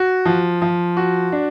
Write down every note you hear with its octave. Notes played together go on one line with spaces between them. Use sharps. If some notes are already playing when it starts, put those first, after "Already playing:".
Already playing: F#4
F3
F3
F#4
D4